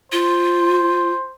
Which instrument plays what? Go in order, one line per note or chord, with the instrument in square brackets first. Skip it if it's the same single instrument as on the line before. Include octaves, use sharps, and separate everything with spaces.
[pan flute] F4 [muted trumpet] C5